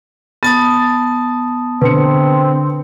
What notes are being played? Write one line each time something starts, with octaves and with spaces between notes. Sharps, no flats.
B3 A5 D#6 A6
D3 C4 B4 G5 C#7